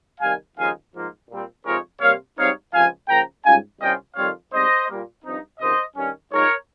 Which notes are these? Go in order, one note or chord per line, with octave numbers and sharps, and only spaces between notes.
C3 D#3 G3 F5 G#5
D#2 C#3 F3 G#3 D#4 F5 G#5
G#2 F3 A#3 F4
A#2 G3 C4
F2 C3 F3 G#3 D#4 A#4 C#5
C3 G3 A#3 C#5 F5
G#2 G3 C4 D#4 C#5 F5
C#2 C3 F3 F5 G#5
C#3 F3 A#3 G5 A#5
G#2 G3 C#4 F4 F5 G#5
C2 C3 G3 C#4 F4 D#5 G5
F2 D#3 G3 C4 F4 C#5 F5
G#2 G3 C4 C5 D#5
A#2 G3 A#3
G2 F3 C4 D#4
C#2 C3 D#3 C5 D#5
G2 D#3 G3 C#4
A#2 G#3 D#4 A#4 C#5